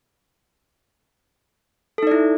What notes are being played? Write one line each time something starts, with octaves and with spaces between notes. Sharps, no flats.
D#4 E4 A4 D5